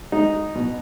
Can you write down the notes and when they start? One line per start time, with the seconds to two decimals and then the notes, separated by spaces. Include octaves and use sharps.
0.12 G#3 D#4
0.55 B2